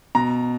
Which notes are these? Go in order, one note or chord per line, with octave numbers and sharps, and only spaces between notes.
B2 A#5